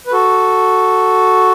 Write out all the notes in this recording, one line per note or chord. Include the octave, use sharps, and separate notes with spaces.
B4
F#4 A4